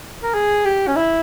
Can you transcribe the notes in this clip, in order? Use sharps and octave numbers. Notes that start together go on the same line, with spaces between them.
A#4
G#4
G4
C#4
E4